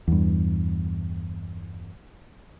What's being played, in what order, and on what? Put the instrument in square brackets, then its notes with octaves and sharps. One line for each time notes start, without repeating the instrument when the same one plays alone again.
[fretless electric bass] E2 G2